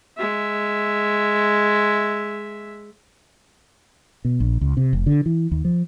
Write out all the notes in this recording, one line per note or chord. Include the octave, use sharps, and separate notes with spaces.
G#3 E5
B2
A#1
C#2
C3
F1
D3
E3
D#2
F3